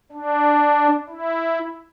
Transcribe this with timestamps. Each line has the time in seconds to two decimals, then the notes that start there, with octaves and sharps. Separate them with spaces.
0.12 D4
1.09 E4